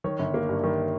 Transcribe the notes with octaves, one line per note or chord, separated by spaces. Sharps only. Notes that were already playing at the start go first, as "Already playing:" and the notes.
D#3 C#5
G1
A#3
G2
D#3